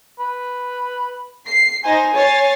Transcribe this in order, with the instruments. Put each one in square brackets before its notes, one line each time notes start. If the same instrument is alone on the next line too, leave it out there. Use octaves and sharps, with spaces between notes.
[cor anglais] B4
[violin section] C7
[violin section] D#4 C5 [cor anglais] G#5
[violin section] C#5 A6 C7